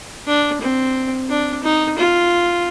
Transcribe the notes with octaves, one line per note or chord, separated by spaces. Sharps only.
D4
C4
D4
D#4
F4